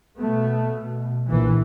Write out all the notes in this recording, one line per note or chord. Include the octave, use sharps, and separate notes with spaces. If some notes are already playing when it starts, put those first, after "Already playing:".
B2 A3 B3
B2
A#1 E3